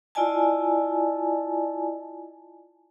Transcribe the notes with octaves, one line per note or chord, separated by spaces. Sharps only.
E4 F4 D5 D#5 G#5 A5